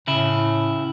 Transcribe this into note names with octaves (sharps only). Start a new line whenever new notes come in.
A2 C#3 E4